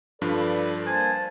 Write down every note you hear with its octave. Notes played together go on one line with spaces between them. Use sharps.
G2 F3 D4 A4 B4 D5
A#3 C5 G#5 A5